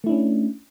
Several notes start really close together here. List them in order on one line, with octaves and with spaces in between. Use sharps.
A3 E4 D4 C#4